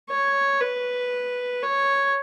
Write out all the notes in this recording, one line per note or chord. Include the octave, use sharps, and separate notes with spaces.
C#5
B4
C#5